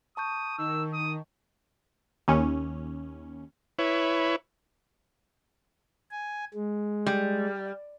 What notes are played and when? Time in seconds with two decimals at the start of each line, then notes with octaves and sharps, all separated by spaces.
0.17 A5 C#6 D#6 G6
0.58 D#3 E6
0.94 D#6
2.28 D#2 C#4
3.79 E4 B4 C#5
6.11 G#5
6.54 G#3
7.06 G3